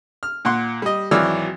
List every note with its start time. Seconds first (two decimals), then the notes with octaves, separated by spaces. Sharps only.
0.23 F6
0.45 A#2 F#5 C6
0.82 G3 D#5
1.11 G#1 E3 F#3 D5 E6 F6